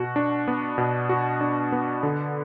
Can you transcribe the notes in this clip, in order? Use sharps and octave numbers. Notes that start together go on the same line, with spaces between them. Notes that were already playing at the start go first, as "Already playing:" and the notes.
Already playing: B2 F#4
D4
B3
B2
F#4
D4
B3
D3